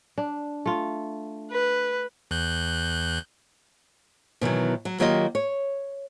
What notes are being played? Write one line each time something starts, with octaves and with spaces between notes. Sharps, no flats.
D4
A3 F4
B4
E2 F#6 G6
B2 D#3 E3 F#3
F#3
D#3 F#3 A#3 F4 G4 D#5
C#5